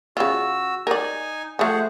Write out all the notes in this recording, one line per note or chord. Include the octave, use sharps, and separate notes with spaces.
C#3 F4 F#4 E6
D#4 A#4 D5 G#5
F3 A3 G#4 C5 F#5